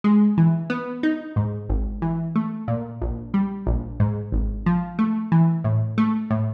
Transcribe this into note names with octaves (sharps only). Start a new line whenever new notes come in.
G#3
E3
B3
D#4
G#2
G#1
E3
A3
A#2
A#1
G3
A#1
G#2
G#1
F3
A3
E3
A2
A3
A2